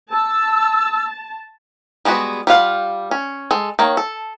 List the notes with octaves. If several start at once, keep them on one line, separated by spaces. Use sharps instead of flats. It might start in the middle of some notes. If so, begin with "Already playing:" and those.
A5 E6
G3 G#3 B3 D#4 F#4
G3 F4 F5 F#5
C#4
G#3 A4
D#3 A#3 C#5
A4